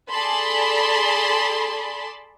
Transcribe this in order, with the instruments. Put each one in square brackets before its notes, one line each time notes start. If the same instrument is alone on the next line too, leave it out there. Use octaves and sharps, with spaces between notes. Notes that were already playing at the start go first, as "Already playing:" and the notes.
[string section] G#4 A4 D5 A5 B5 C6